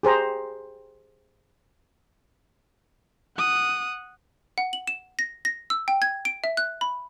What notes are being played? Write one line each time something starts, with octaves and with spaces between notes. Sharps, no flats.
G4 G#4 C5 A#5
F#5 D#6
F#5
F#7
E7
A#6
A#6
E6
G5
G#6
D7
E5
F#6
B5